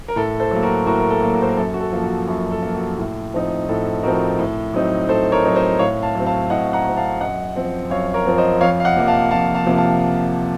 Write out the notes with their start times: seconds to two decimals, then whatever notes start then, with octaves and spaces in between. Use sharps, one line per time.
0.08 A#4
0.16 A2 A4
0.40 A4 C5
0.51 F#3 A#3
0.63 F#4 A#4
0.86 A2 F#4 A#4
1.00 A#4
1.10 A4
1.22 F#3 A#3
1.34 F#4
1.42 C5
1.49 A#4
1.57 F#2 A4
1.74 F#4
1.80 A4
1.92 F3 A#3
2.04 F#4
2.27 F#2 F#4
2.51 A4
2.62 F3 A#3
2.75 F#4
2.98 A2
3.34 F3 C4 D#4
3.69 A2 A4
4.03 F3 C4 D#4 F#4 A#4
4.39 A2
4.74 F#3 C4 D#4
5.09 A2 A4 C5
5.32 A#4 C#5
5.45 F#3 C4 D#4
5.56 C5 D#5
5.79 A2 C#5 F5
6.02 F5 A5
6.15 F#3 C4
6.26 F5 A5
6.50 A2 D#5 F#5
6.73 F#5 A#5
6.85 F#3 C4
6.97 F5 A5
7.20 F#2 D#5 F#5
7.56 F3 C4
7.90 F#2 C#5 F5
8.14 A#4 C#5
8.26 F3 C4
8.38 C5 D#5
8.61 F2 C#5 F5
8.80 F5
8.84 D#5 F#5
8.96 C3 F3 A#3
9.08 F5 A5
9.31 F2 F5 A5
9.54 F5 A5
9.66 C3 F3 A#3
9.78 F5 A5